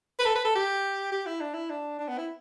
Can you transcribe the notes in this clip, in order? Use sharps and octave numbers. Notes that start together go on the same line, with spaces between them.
B4
A4
B4
A4
G4
G4
E4
D4
E4
D4
D4
B3
E4